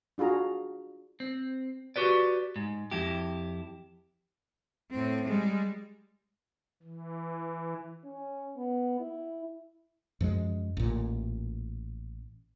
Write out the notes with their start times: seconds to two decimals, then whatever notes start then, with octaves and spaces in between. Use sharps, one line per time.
0.18 D4 F4 F#4 G#4 A#5
1.20 C4
1.96 F#4 G4 B4 D5
2.56 G#2
2.91 F2 E4 G4
4.91 A2 C4
5.25 G3 G#3
6.83 E3
8.04 C#4
8.57 B3
9.00 E4
10.21 F#2 F3 G#3
10.77 A1 A#2